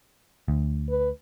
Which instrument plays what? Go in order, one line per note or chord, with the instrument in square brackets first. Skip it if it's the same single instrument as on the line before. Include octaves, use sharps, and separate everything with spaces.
[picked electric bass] D2
[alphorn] B4